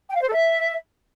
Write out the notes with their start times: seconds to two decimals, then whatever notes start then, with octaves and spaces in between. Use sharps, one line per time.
0.09 G5
0.15 F5
0.21 C5
0.27 A4
0.33 E5